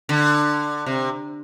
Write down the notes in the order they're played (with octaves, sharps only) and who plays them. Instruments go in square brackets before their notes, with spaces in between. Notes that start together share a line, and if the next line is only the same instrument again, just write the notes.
[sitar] D3
C3